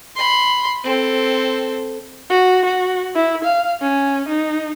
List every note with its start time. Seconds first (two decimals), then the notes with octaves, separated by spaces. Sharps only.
0.16 B5 C6
0.83 C4 A4
2.30 F#4
2.65 F#4
3.15 E4
3.44 F5
3.82 C#4
4.29 D#4